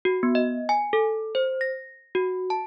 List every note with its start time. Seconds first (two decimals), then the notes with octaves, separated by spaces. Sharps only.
0.05 F#4
0.23 B3
0.35 D#5
0.69 G#5
0.93 A4
1.35 C5
1.61 A#6
2.15 F#4
2.50 A5